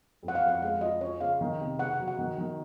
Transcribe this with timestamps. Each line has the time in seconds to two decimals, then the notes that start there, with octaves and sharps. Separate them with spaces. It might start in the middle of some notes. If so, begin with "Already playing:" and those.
0.23 F2
0.28 F#5
0.35 F5
0.42 F2
0.48 F#5
0.62 G#3 F5
0.81 F4 D#5
1.01 C#4 C#5
1.20 C#3 F5
1.41 D#3
1.60 C3
1.79 C#3 F#5
1.99 F#3
2.08 F#5
2.18 D#3
2.38 D#3